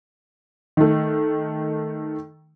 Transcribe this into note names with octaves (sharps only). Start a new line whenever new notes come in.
D#3 A3